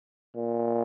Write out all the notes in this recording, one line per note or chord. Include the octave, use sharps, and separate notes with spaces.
A#2